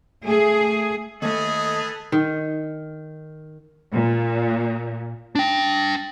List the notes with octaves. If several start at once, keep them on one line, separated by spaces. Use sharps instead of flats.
A3 G#4
D#2 A3 B3 G#4 A4 D#5
D#3
A#2
D4 G5